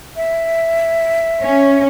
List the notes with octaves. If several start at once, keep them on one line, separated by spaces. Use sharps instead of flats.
E5
C#4